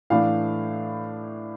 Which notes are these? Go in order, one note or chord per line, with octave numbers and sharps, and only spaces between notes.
A2 E3 A3 D4 F5